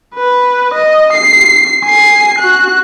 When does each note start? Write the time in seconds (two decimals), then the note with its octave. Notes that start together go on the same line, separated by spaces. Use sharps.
0.16 B4
0.75 D#5
1.13 C7
1.84 G#5 C7
2.39 F#4 F#6